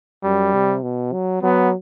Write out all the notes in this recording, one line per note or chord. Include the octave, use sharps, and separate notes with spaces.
F#2 G3
C3
B2
F#3
F#3 B3